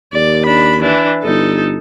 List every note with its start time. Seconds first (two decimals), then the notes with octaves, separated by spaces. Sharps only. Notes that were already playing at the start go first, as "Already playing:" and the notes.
0.13 D#2 D5
0.46 D4 B5
0.82 E3 D4
1.24 G1 D#4 A4